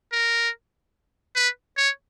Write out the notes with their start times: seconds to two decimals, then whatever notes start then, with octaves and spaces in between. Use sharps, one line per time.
0.13 A#4
1.36 B4
1.77 C#5